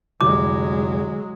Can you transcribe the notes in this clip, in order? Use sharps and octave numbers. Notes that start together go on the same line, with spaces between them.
F1 C2 D3 F#3 G#3 E4 D6